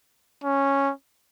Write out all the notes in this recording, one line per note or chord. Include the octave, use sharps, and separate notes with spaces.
C#4